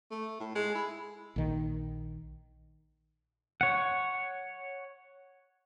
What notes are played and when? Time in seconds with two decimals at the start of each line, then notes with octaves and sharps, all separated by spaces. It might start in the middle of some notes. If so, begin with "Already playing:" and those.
0.11 A3
0.40 A2
0.55 G#3
0.75 E4
1.36 A#1 D#3
3.61 C#5 F#5